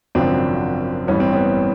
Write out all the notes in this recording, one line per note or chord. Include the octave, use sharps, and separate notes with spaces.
G#1 F#2 C#3 F3 C4 D4
A1 G2 E3 C#4
C4
B3 C#4